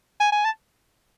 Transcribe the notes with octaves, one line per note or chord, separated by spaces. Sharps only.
G#5
G#5
A5